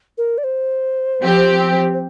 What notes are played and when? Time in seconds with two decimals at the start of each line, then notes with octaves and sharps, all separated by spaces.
0.18 A#4
0.38 D5
0.44 C5
1.22 F3 C4 G4
1.93 C5